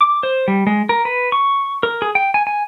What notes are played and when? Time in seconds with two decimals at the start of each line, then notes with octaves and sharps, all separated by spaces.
0.01 D6
0.23 C5
0.48 G3
0.67 G#3
0.89 A#4
1.05 B4
1.32 C#6
1.83 A#4
2.02 G#4
2.15 G5
2.34 G#5
2.47 G#5